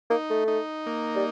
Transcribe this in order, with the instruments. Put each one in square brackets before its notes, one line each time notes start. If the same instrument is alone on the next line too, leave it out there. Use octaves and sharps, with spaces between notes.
[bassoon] A#3 [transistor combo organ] D#4
[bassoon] A3
[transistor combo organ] D#4
A#3
[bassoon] G3